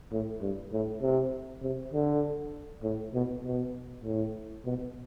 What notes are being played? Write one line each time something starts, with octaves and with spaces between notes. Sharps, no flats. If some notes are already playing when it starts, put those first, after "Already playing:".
A2
G2
A2
C3
C3
D3
A2
B2
B2
A2
B2